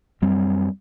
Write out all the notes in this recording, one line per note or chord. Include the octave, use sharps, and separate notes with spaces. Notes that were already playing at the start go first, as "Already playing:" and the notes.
F#2 G3 C4